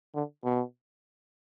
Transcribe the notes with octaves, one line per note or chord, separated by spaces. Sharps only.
D3
B2